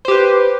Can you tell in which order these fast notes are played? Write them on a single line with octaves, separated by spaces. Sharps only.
C5 G4 B4